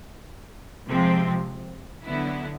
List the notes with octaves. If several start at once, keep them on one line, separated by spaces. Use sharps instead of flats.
C3 F3 G#3 C4
D3 F#3 B3 E4